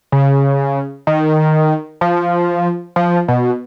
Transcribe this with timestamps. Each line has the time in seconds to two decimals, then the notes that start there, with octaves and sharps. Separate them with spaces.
0.12 C#3
1.07 D#3
2.01 F3
2.96 F3
3.28 B2